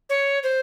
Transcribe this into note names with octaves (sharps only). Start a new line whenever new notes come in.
C#5
C5